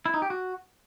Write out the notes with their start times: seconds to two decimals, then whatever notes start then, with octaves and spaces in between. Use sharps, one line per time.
0.06 E4
0.14 D#4
0.22 G4
0.30 F#4